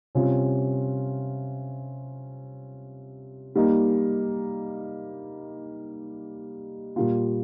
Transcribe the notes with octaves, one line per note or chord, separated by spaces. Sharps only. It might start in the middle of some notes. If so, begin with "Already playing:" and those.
C3 G3 C#4 F4
G3 A#3 D#4
A#2 G3 A#3 F4